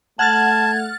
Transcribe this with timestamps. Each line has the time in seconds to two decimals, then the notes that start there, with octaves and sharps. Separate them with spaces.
0.19 A3 F#5 A5 F6 G#6 A6